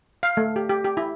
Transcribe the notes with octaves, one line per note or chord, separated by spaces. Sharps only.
F5
A3
G4
G4
G4
E4